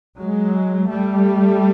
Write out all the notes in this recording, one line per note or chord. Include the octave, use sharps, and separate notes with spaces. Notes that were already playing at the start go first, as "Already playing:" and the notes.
F#3 G#3
G3 A3